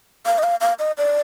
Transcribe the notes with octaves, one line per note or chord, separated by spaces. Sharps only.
F5
D#5
F5
F5
D#5
D5